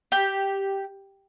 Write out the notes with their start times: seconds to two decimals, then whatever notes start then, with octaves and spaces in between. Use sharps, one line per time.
0.12 G4